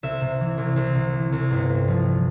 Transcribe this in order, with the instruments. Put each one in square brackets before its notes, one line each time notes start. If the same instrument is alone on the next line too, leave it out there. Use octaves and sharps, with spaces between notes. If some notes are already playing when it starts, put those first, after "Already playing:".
[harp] C2 E5
C3
E3
C2
C2
C3
E3
C2
G1
G2
F3